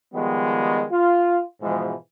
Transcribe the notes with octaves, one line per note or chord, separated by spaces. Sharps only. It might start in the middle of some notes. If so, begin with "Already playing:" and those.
D#3 F3 G3 G#3 B3
F4
G#2 B2 E3 F3 G#3